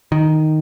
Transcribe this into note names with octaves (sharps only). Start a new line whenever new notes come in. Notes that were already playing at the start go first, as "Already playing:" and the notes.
D#3